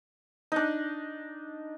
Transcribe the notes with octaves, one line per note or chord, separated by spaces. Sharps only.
D4 D#4